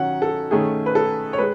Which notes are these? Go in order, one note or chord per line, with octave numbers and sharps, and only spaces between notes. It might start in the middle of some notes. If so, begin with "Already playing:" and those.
Already playing: D#3 F#3 C#4 F#5
A4
D#3 A3 C#4 G#4
B4
A4
C#5
G#3 B4